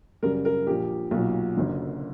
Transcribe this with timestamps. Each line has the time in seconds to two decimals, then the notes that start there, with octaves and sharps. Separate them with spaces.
0.23 F#2 C#3 G3 A#4
0.45 A#4
0.67 A#1 A#2 A#3 G4
1.11 B1 A#2 F#3
1.55 F#1 F#2 D3